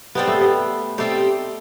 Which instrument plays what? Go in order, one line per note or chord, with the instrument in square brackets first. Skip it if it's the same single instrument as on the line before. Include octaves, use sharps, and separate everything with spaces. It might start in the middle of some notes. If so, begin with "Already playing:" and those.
[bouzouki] G3 C4 D#4 G4 [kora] B3
[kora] A3
B3
[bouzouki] G3 C4 D#4 G4 [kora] A3